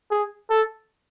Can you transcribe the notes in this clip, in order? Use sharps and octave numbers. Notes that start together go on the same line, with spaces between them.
G#4
A4